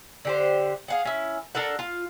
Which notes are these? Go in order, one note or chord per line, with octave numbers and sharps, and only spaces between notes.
D3 G4 C5
G#4 F5 F#5
C#4 E4
D4 A4 A#4 F#5
F4